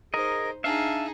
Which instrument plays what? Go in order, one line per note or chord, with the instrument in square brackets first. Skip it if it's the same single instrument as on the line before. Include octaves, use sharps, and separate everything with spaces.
[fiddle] D#4 C5 [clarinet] G#4 [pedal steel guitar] A#4 D#5
[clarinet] D4 [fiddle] D#4 G#4 [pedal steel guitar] E5 F5